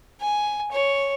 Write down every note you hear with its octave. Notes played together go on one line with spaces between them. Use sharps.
G#5
C#5